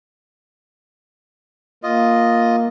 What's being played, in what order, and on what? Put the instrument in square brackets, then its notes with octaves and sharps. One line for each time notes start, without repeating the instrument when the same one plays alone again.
[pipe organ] A#3 [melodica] F4 D#5